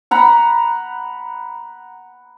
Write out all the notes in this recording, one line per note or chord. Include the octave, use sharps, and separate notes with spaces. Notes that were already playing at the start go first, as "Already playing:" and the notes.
F#5 A#5 B5